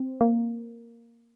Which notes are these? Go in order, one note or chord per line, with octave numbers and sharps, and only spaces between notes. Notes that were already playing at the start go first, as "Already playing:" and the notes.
Already playing: C4
A#3